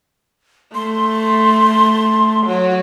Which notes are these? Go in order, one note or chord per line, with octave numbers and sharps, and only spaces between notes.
A3 C6
F#3